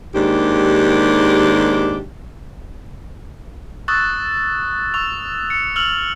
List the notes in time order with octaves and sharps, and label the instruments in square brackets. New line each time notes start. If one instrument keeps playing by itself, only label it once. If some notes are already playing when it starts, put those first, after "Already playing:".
[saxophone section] D#2 G#2 D4 G4
[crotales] C#6 D#6 E6 F#6 A6
C#6 E6 F7
C#7
E6 F6 F7 F#7